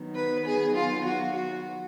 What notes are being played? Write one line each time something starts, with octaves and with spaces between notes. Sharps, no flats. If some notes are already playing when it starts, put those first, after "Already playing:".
Already playing: D#3 F#3 B3
B4
G#4
F4
F#4
F#4